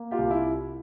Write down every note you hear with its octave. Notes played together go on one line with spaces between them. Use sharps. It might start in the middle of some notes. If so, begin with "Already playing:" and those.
Already playing: A#3
F4 G4
C2
E4